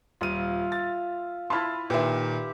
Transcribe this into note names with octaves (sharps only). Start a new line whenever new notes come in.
D#1 F4 E5 F5 D#7
A6
E4 B4 A5 C6 F6 A6
A#2 D#3 G4 B4 E5 C6